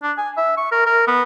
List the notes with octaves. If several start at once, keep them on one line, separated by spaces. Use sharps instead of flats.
D4
G#5
E5
C#6
A#4
A#4
B3